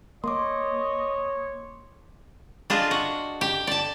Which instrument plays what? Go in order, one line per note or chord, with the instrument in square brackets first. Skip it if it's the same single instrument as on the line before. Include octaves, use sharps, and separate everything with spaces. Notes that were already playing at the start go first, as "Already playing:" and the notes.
[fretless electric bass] A#3 [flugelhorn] C#5 [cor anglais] D#5 [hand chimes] C6 D6
[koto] D4 F4 G#4 D#5
F#4
G4
D5 A5